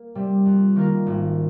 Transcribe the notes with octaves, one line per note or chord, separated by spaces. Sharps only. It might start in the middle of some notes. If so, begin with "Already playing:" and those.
Already playing: A#3
C3 G3 C4
F2
D#3 A#3 F4 A#4
G#1